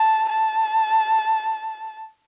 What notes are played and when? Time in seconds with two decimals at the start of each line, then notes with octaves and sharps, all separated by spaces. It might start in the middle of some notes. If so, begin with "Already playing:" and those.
Already playing: A5
0.30 A5